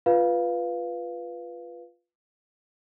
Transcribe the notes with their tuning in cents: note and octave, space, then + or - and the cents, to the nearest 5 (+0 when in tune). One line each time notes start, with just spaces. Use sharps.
F4 +0 B4 +0 F5 +0